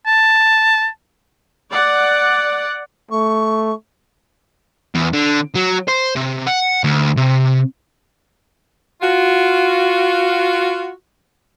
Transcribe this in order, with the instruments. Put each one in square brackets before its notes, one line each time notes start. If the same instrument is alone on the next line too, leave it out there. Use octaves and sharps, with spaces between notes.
[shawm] A5
[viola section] D5 F#5
[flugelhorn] A3 [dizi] C#6
[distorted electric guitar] E2
D3
F#3
C5
C3
F#5
D2
C3
[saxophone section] F4 F#4